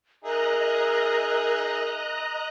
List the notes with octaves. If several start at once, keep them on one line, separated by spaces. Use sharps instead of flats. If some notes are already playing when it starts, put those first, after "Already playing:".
D#4 G#4 A#4 D#5 E5 A#5 F#6